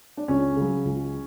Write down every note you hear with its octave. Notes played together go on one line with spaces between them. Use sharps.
D4
C#2 C#4
C#3 F#3
C#2